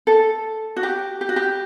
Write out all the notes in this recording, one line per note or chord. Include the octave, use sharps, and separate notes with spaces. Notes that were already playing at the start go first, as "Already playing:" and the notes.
A4
F#4
G4
G4
F#4
G4